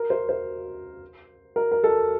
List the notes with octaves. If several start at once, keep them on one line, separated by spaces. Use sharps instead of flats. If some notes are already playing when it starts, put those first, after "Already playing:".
Already playing: A#4
C5
C5
A#4
A#4
A4